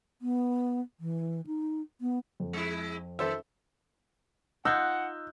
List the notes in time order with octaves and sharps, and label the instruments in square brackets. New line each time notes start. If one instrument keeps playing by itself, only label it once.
[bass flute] B3
E3
D#4
B3
[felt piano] F2
[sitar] G#3 E4
[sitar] D#3 [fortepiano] A4 C5 E5
[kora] D#4 F4 [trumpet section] F#5 [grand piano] E6 F#6 G6